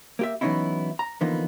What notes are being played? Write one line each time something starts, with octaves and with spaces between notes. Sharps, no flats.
A#3 G4 E5
E3 F#3 B3 C#4 D#4 E4
A#5
D3 E3 F3 A#3 B3 D#4